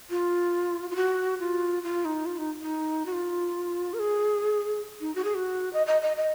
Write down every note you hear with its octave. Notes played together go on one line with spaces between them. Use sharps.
F4
F4
F#4
F4
F4
D#4
F4
D#4
D#4
F#4
F4
A#4
G#4
D#4
F#4
G#4
F#4
D#5
D#5
D#5
D#5